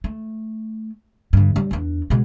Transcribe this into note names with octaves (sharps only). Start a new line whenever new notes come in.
A3
G2 D3
G3
E2 D4
B2 G#3